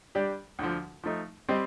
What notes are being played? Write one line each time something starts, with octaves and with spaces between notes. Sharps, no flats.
G3 D4 G4 D5
D2 D3 F3
F3 A3 D#4
G3 C4 G4 C5 D#5